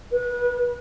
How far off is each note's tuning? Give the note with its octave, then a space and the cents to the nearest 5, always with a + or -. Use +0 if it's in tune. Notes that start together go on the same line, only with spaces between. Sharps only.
B4 -30